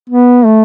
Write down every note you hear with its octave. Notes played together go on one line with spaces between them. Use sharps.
B3
A3